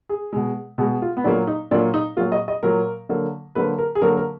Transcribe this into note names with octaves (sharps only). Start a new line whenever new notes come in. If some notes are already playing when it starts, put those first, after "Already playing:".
G#4
B2 G#3
B2 G#3 G#4
F4
B3
A#2 F#3 A#3 D4
D#4
A#2 F#3 A#3 D4
D#4
A#2 F#3 A#3 F4
D#5
D#5
A#2 F#3 A#3 A#4
D3 F#3 A#3
D3 F#3 A#3 B4
A#4
G#4
D3 F#3 A#3 A#4
A#4